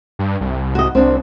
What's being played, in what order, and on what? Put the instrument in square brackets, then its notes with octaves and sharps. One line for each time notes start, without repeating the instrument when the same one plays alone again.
[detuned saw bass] G2
C2
[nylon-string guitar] F#4 D#5
[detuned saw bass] C2 [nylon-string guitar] C4 D4